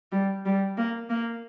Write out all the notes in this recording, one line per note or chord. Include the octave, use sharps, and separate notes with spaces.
G3
G3
A#3
A#3